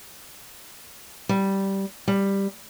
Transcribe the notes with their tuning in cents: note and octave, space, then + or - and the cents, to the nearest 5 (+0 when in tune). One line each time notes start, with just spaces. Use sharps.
G3 -10
G3 +5